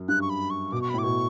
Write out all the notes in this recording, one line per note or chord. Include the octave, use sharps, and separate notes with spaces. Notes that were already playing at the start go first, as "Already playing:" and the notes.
Already playing: F#2
G2 F#6
C#6
B5
C#6
B2 D6
C#6
B5
A2
D6
B2 C#6